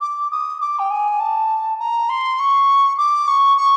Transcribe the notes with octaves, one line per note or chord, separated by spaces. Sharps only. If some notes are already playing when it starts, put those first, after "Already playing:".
D6
D#6
D6
G5
G#5
A5
A#5
C6
C#6
D6
C#6
C#6